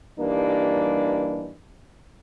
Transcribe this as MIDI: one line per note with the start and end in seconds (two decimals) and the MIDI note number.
0.19 1.52 43
0.19 1.52 52
0.19 1.52 55
0.19 1.52 58
0.19 1.52 62
0.19 1.52 63